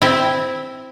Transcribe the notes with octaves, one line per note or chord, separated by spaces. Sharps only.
C4 E4